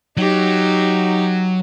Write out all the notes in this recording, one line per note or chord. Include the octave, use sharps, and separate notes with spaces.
F#3 D#4 G4